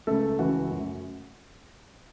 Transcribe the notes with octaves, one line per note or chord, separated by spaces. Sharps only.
C#2 C#3 A3 A4
C#2 C#3 E3 F#4
F#2 F#3 A3